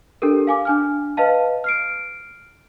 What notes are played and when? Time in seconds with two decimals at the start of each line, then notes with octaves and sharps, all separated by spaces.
0.22 D4 G4 A4 A#4
0.47 F5 G#5 D6
0.65 D4 G#5 F6
1.17 B4 D#5 F5 A5
1.64 F6 C7 D7